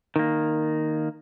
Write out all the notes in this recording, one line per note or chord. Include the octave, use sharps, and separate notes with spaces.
D#3 A#3